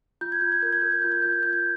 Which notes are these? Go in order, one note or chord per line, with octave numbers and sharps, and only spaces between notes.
F4 G6
G#6
F4 G6
G#6
A#4 G6
G#6
A#4 G6
G#6
F4 G6
G#6
F4 G6
G#6
F4 G6
G#6